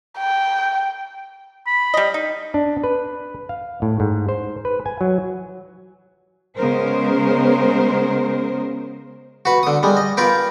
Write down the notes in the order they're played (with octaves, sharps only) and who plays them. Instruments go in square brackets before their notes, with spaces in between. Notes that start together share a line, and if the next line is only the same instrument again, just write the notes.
[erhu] G5
[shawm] B5
[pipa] G3 D#5
D#4
[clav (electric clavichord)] D4
B4
F5
A2
G#2
C5
B4
G#5
F#3
[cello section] C#3 G#3 B3 A#4 C5
[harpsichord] F#4 B4
D3 D#6
G3 G#3
D#5
F4 A#4 B4 G5